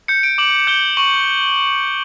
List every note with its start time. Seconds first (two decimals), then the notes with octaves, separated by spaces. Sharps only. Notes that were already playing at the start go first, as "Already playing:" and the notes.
0.08 G6 C#7
0.23 D7
0.38 D6 F#7
0.67 G6 G7
0.97 C#6 F#7